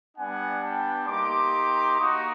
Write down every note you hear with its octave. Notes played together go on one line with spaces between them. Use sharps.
G3 B3 D4 F#5 G#5
G5 A5
A#3 D#4 G4 C6 D6
A#3 D#4 F#4 C#6 D#6